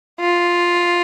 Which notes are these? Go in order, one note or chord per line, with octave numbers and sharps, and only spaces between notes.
F4